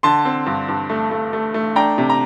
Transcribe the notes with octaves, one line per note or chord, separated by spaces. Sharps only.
D3 A5 C6
C4
G2
G2
A3
A3
A3
A3
D4 G5 A#5
C3
A#5